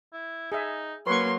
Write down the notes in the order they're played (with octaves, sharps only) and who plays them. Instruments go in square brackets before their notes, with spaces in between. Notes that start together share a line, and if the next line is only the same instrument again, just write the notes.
[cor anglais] E4
[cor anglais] D#4 [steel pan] G#4 E5
[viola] F#3 A#3 [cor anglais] C#4 [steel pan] B4 C#6 [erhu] C6